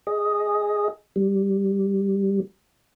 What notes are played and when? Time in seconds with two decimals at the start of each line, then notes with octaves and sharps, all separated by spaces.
0.07 G#4 D#5
1.16 G3